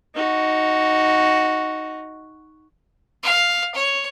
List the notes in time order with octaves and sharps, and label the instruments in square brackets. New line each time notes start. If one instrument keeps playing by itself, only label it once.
[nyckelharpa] D#4 F#4
[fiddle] F5
C#5